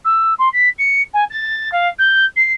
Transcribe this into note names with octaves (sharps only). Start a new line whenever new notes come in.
E6
C6
B6
C#7
G#5
A6
F5
G6
C7